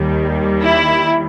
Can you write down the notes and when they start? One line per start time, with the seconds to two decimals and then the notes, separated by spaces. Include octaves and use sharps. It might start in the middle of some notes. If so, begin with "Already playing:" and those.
Already playing: D#2 D#3 G3
0.62 E4